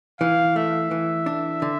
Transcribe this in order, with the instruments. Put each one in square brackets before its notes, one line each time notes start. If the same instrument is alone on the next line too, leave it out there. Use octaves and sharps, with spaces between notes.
[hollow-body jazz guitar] E3 [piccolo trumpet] F5
[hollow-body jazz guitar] A3 [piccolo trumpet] E5
[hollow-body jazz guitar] E3
D4
D3